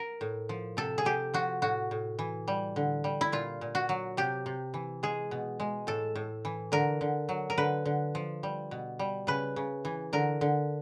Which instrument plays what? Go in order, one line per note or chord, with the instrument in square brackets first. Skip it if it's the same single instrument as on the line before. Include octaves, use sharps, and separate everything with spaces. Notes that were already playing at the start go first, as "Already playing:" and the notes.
Already playing: [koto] A#4
A2
F3
C3 A4
G#4
C3 G4
F3 F#4
A2 F#4
A2
E3
G3
D3
G3
E4
A#2 F4
A#2
F#4
F#3
C3 G4
C3
E3
G#3 G#4
B2
G#3
A2 A4
A2
E3
D3 A#4
D3
F#3
A#4
D3 B4
D3
F3
G3
B2
G3
C#3 B4
C#3
E3
D3 A#4
D3